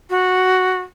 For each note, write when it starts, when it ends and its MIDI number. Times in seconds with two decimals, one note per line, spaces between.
0.10 0.79 66